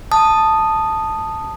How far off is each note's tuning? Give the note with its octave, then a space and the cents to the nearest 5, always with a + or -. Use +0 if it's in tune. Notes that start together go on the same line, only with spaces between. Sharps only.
A5 +0 D#6 -10